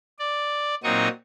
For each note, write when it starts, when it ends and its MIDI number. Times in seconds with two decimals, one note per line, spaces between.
0.19 0.75 74
0.84 1.08 46
0.84 1.08 54
0.84 1.08 60
0.84 1.08 63
0.84 1.08 85
0.84 1.08 87